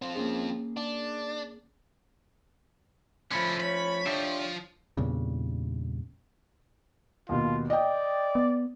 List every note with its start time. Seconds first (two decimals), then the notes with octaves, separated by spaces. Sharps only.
0.02 F3 C4
0.15 A#3 C#4 G#4
0.77 D4
3.31 D3 F3 A3 C#4 B5
3.60 C#5 B5
4.06 F3 D4 G4 E5
4.97 E2 G2 A#2 C#3
7.29 D#2 B2 F4
7.70 D5 D#5 G5
8.35 B3